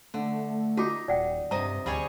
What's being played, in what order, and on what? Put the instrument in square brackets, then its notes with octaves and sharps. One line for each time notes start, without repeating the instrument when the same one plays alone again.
[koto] D3 [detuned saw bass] A3
[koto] D#4 [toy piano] F4 F#4 D6
[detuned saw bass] D#1 [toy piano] D5 F#5 G5
[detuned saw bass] G2 [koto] C3 D#5 [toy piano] A#5
[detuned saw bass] D2 [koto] G3 G#4 C#5